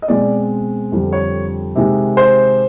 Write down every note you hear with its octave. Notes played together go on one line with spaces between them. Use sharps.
D#5
B2 G#3 C4 D5
F2 D3 G3
C#5
C3 D#3 G#3
C5